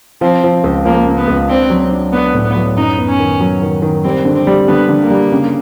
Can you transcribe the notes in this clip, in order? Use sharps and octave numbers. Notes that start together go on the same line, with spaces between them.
F3 C4
F3
C#2
F3 A#3
C#3
B3
C#2
C4 D4
F#3
D4
B3 D4
A2
B3
F#3
F#2 D#4
B3
C#4
D#3
F#3
D#3
D#3
G3 C4
D3
C4
G3
D3 B3
D3
A#3
G3
C#3